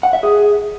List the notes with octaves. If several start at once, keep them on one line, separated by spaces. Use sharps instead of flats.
F#5
E5
G#4